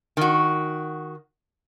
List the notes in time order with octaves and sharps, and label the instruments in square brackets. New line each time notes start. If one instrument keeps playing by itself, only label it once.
[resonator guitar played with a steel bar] D#3 F#4